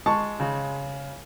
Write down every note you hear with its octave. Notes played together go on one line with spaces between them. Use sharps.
G#3 A5 C#6
C#3